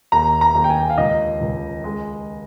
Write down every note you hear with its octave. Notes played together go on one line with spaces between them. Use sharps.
D#2 A#5
A#5
D#2
G5
G#5
F5
C#2 D#5
C#2
G#3